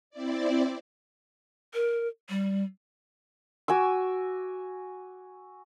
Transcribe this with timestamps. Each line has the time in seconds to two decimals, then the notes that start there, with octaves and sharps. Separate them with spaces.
0.10 C4 E4 D5
1.73 A#4
2.29 G3
3.68 F#4 G#5 D6 E6